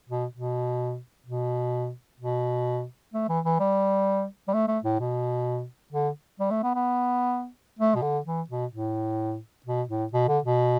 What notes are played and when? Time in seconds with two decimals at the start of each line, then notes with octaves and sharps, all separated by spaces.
0.09 B2
0.33 B2
1.26 B2
2.20 B2
3.13 A3
3.29 E3
3.45 E3
3.60 G3
4.48 G3
4.53 A3
4.68 A3
4.84 A2
5.00 B2
5.92 D3
6.40 G3
6.51 A3
6.63 B3
6.75 B3
7.79 A3
7.95 B2
8.02 D3
8.25 E3
8.49 B2
8.73 A2
9.66 B2
9.89 A2
10.13 B2
10.28 D3
10.44 B2